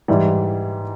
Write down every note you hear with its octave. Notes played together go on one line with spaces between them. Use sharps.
G#2 E3 G3